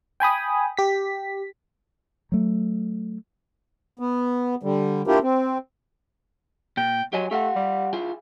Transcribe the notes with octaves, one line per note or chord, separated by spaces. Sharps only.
G5 G#5 B5 D#6
G4 B6
F#3 A3
B3
D3 G3
A#3 D4 E4 F4 G4 A#4
C4
A#2 G5
F#3 G4 D#5 G#5
A3 G4 F5 F#5
G3
E4 F4 G#4